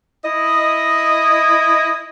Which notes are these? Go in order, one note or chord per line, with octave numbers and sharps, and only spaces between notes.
E4 D#5